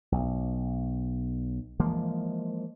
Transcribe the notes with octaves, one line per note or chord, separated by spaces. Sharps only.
B1
E3 F3 G#3 A#3